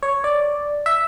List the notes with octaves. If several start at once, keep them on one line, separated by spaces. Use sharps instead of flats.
C#5
D5
E5